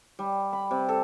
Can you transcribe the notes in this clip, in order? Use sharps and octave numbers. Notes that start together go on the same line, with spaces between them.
G3
B5
C3
A4